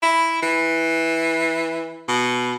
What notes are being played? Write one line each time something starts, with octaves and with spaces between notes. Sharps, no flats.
E4
E3
B2